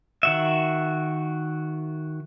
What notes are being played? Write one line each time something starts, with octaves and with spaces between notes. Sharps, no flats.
D#3 F#4 E5